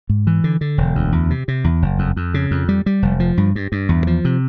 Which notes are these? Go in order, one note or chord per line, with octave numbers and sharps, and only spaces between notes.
G#2
E3
D3
D3
E1
D2
E2
C3
C3
E2
F#1
F2
F2
C#3
F2
G3
G3
F1
F3
G2
G2
G2
E2
F3
C3